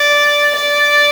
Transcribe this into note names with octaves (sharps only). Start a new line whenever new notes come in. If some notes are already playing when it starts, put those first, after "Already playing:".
Already playing: D5
D5